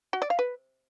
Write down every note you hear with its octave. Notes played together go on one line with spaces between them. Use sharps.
F#4
D5
F5
B4